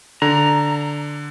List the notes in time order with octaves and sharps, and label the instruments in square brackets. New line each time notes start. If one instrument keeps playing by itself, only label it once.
[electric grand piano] D3 [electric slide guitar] A#5